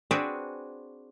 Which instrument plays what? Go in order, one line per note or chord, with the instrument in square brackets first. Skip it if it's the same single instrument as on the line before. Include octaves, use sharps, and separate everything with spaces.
[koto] C4 D4 F#4 G#4 B4